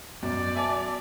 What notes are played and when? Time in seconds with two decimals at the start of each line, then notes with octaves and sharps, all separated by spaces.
0.23 F#2 B2 D5
0.55 E5 G#5 A5 D6